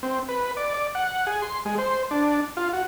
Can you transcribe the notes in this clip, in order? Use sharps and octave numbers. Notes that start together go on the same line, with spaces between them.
C4
B4
D5
D5
F#5
G#4
C6
G#3
C5
D4
F4
F#4